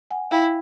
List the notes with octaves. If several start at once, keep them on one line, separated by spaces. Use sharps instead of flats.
F#5 G#5
E4 F5 G5